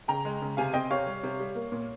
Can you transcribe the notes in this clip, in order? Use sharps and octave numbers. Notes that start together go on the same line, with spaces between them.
C#3 G5 A#5
G#3
C#3
C3 F5 G#5
C4 D#5 G5
C3 C#5 F5
G3
C3
G3
A#3
A#2